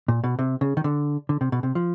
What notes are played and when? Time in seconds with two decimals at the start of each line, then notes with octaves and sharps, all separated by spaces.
0.08 A#2
0.24 B2
0.39 C3
0.61 C#3
0.77 D#3
0.84 D3
1.29 D3
1.41 C3
1.52 B2
1.63 C3
1.75 F3